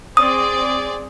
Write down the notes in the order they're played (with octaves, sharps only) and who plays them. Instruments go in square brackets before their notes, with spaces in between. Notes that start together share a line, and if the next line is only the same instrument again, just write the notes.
[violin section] C4 G#4 D5 [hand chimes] D#6